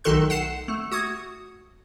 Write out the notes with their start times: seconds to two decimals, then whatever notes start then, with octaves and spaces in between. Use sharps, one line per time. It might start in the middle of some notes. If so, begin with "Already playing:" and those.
0.04 B1 D#3 A3 A4 C6 F#6
0.30 F#5 C7 E7
0.68 A3
0.92 F#4 D#6 G#6